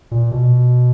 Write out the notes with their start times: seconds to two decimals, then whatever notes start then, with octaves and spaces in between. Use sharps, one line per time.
0.11 A#2
0.31 B2